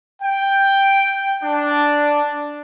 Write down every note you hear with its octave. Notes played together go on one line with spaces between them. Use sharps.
G5
D4